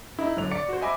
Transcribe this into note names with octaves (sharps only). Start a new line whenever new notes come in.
D#4 E4
F#2 D3 C#5 F7
D5 C#7
F#4 C5
D#5 E5 G#5 B5 D6